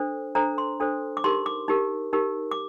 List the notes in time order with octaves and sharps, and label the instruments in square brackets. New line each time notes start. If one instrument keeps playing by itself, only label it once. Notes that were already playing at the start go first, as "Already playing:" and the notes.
Already playing: [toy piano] D4 A4 C5
D4 A4 C5 A#5
C6
D4 A4 C5
D6
D#4 G4 A#4 C6
D6
D#4 G4 A#4
D#4 G4 A#4
D6